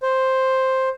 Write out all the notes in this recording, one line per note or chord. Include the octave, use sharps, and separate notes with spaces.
C5